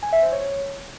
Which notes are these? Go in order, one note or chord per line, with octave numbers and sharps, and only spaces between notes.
G#5
E5
C5
C#5